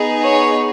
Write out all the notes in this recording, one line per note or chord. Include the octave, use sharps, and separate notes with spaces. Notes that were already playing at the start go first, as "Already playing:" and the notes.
Already playing: B3 D#4 G#4
C#5